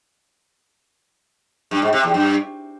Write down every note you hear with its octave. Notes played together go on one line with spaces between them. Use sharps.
G2
G#2
C3
E2
G2